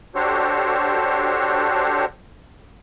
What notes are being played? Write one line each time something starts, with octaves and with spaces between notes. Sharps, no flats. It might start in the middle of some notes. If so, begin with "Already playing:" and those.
D4 F#4 G4 A4 C5 C#5